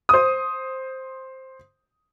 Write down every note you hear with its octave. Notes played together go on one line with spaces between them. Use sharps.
C5 D#6